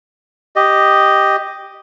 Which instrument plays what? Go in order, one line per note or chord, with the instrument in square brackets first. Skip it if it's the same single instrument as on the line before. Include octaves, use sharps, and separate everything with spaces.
[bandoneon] G4 D#5